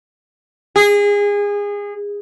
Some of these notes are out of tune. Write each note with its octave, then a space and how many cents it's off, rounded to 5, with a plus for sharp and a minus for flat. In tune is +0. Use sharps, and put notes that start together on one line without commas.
G#4 -25